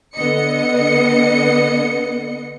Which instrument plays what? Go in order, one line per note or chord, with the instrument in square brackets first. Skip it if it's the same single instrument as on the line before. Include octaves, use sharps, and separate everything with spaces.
[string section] D3 B3 D#5 C#7